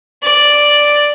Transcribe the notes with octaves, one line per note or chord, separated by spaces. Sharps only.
D5